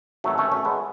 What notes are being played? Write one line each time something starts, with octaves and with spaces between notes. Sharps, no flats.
G#1 G#2 E3 F#3 A3
A3 C#4
A3 C#4
G#3 B3